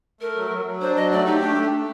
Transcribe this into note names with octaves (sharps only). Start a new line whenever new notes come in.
A3 A#4
F#3
F#3
F#3
D4 C5
F#3 D#5
A3 D5
D#4 G4
A3 D4
A3
A3